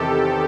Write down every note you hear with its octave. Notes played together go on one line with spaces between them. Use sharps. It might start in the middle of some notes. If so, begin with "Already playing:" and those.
Already playing: E2 C3 D#3 G4 A4